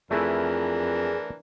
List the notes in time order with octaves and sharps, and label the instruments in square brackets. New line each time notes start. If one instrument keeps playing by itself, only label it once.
[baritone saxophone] F2 [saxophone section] E3 D4 A#4 [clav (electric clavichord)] A3 E4 B4 [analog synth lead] G#4